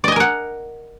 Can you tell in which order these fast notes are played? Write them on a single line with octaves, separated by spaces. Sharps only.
D5 D#5 G#5 A#4 F#5